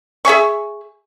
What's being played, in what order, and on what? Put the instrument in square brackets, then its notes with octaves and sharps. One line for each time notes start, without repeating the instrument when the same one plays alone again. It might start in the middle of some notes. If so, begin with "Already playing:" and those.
[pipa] G#4 E5 G#5 C#6